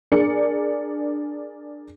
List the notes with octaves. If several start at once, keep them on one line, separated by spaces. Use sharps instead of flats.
D4 G#4 A#4 D5 C#7